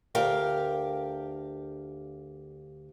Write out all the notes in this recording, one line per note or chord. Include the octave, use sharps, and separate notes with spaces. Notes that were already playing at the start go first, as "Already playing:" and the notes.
D2 G4 A#4 F5 G5